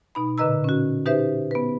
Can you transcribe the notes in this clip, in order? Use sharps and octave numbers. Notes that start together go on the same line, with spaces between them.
B2 D#4 B5
A#2 D3 B4 D#5 A#5 E6
C#4 F#4
D#4 G4 B4 C5 E5
B3 B4